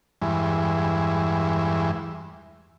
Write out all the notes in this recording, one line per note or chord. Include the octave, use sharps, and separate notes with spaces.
E2 G2 E3 G#3